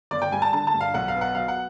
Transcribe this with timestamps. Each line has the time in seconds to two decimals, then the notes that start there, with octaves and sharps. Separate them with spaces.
0.11 G1 D5
0.22 G5
0.32 G3 G#5
0.42 A5
0.53 D3 A5
0.67 A5
0.74 G2
0.80 F5
0.94 B1 F#5
1.08 F5
1.15 B3
1.21 F#5
1.35 F#3 F5
1.48 F#5